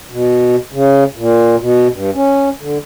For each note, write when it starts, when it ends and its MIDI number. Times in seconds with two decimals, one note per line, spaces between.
0.11 0.56 47
0.72 1.04 49
1.16 1.56 46
1.59 1.88 47
1.92 2.10 43
2.14 2.49 61
2.60 2.78 50